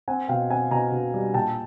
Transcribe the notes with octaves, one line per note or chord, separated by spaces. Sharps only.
C4 F#5 G#5
B2 F5 G5
C4 F#5 G#5
B2 G#5 A#5
B2
G3
A#2 G5 A5